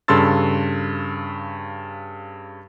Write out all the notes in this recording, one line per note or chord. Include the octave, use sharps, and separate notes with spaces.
G2 C#3 A4 C6 E6 A6